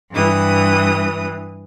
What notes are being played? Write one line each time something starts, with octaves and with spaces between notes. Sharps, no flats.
G2 E3 D#6